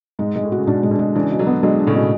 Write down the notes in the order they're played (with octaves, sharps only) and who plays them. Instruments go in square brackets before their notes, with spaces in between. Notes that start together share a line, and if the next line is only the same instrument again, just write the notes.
[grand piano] G#2 [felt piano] G#3
[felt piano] G#3
[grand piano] A2
[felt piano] F#4
[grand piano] C#3
[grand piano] G#2 B2 [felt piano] D4
[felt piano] G#3
[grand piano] B2 D3
[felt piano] G#3
[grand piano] C#3 E3 [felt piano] D4
[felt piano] B2
[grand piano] D3 F#3
[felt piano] B3
[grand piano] D3 F#3 [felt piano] G#3
[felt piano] D4
[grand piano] A2 C#3
[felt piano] B2